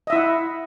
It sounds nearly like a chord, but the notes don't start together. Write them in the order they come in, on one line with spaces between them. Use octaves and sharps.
D#5 E5 E4 F#5